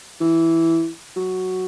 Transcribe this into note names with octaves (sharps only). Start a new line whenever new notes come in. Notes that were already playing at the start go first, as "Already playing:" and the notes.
E3
F#3